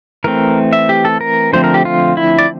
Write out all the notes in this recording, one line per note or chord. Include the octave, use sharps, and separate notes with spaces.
E3 A3 C4 A#4
E5
G4
A4
A#4
D3 F3 A3 C4 C5
A#4
G4
F4
E4
D5